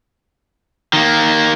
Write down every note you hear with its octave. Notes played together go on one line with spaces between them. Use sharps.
D#3 A#3